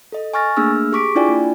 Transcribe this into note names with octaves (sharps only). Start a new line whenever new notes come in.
A4 D#5
G#5 C#6 F6 A6 A#6
A3 A#3 D4 G#4 E6 F6
G4 G#4 C#6 D6 B6 D7
D4 E4 F4 D5 G5 G#5
A#3